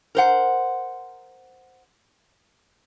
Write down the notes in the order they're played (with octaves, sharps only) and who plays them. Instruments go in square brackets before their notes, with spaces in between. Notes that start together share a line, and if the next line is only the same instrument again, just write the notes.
[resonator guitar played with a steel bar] A#4 C5 F#5